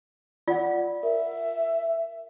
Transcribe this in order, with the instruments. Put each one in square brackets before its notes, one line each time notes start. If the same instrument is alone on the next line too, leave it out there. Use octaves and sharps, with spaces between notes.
[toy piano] F4 [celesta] D5 F#5
[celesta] A#4 [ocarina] E5